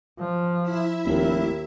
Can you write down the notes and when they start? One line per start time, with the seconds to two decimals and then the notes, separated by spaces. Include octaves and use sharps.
0.19 F3
0.62 E4 E5
1.06 F1 D#2